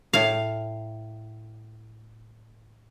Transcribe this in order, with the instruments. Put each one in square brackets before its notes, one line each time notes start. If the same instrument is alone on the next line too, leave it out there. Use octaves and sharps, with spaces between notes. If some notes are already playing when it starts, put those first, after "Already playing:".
[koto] A2 F5